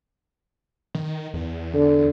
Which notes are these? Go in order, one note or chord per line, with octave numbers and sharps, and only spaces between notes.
D#3
E2
D3